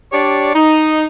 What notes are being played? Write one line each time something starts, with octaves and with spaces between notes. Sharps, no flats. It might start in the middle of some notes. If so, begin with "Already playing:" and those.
D4 G4 C#5 D5
D#4